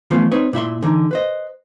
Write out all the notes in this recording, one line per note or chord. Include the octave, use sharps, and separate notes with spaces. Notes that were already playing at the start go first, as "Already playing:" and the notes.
E3 F3 A3 B3 C#4 F4
C4 D#4 B4 C#5
A#2 E4 E5 C6
D3 E3 D#4
B4 C5 D#5